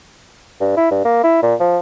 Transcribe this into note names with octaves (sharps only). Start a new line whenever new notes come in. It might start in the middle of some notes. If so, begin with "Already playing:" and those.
G2
E4
G2
A#3
E4
A#2
F3